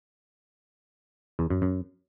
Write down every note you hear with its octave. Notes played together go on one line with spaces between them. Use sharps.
E2
F#2
F#2